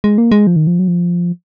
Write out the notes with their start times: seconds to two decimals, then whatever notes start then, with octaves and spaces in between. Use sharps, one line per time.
0.04 G#3
0.18 A#3
0.32 G#3
0.47 F3
0.56 D#3
0.67 F3
0.79 F#3
0.88 F3